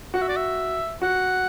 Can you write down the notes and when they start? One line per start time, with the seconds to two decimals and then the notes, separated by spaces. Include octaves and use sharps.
0.14 F#4 F#5
0.22 E5
0.28 D5
0.36 E5
1.02 F#4 F#5